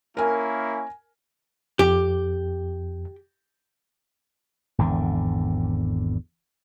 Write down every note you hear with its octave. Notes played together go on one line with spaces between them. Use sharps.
A#3 C#4 E4 A#4 G#5
F2 G4
G#1 E2 D3